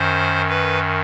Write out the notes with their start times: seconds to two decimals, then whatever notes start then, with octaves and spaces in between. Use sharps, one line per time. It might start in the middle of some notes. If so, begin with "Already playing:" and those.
Already playing: F#2 D#3 C5
0.49 B4